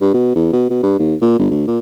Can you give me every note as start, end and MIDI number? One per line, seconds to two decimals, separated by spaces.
0.01 0.10 43
0.14 0.31 47
0.36 0.48 40
0.52 0.65 47
0.70 0.81 47
0.83 0.98 43
0.99 1.15 39
1.21 1.38 46
1.39 1.46 31
1.51 1.64 38
1.67 1.79 46